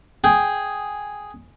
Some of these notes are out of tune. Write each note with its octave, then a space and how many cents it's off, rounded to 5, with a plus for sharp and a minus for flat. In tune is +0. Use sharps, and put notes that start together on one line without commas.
G#4 +0 G5 +0